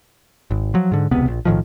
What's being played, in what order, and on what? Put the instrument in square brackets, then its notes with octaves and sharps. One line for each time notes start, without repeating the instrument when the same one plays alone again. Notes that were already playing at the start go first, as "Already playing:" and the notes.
[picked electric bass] G#1
F3 F#3
G#2 D3
E1 C#2 C3 B3
A#1
B1 A2 D#3 F3